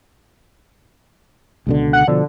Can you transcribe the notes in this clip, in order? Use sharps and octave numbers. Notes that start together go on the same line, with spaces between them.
C#2 B2 D3
F#5
B2 D3 F3